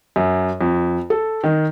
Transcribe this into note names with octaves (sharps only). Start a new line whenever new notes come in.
F#2
F2
A4
D#3